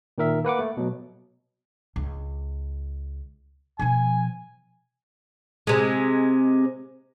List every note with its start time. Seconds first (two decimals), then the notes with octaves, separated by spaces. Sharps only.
0.18 A#2 D#3 A#4 E5
0.44 A#3 B4 F#5 D6
0.59 A3
0.77 B2 F#3
1.96 C#2
3.79 B2 F3 G#5
5.67 C3 G#3